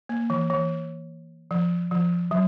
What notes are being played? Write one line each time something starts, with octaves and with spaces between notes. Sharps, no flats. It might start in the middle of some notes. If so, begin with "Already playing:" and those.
A#3
E3
E3
F3
F3
F#3